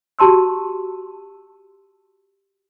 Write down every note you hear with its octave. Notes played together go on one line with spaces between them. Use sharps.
F#4 G4 A5 C6 E6